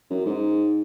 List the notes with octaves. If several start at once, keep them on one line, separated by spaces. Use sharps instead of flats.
F#2
G#2